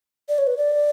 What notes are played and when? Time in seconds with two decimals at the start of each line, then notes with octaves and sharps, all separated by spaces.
0.29 D5
0.38 C#5
0.47 B4
0.57 D5